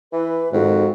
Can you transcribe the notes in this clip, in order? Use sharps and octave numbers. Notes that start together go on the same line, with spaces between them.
E3 B4
F2 G#2 D#3 F#4